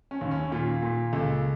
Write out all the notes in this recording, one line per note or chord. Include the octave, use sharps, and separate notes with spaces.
C#4
D#2
C#4
A#2 F4
A#2
C#2 A4